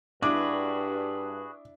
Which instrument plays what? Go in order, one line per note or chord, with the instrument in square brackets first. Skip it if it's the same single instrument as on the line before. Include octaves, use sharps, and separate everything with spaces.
[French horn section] G2 [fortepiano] D4 E4 [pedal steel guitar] F#4 G#4 B4 [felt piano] D6